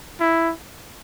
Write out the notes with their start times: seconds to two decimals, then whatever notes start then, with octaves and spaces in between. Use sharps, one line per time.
0.20 E4